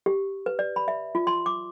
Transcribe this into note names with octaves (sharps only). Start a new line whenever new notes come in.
G4
B4
D5
B5
E5
F4
C6
D6